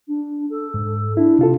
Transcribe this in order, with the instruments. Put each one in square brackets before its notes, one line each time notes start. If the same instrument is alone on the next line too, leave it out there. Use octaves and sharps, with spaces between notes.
[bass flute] D4
A4
[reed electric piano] G#2
[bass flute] D4 [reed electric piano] E4
[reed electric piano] C3 F4 A4